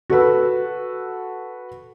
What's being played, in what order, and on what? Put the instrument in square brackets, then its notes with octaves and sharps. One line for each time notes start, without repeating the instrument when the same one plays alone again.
[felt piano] F#4 A4 B4 E6